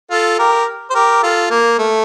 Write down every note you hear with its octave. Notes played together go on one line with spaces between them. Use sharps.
F4 A4
G4 A#4
C5
G4 A#4
F4 A4
A#3
A3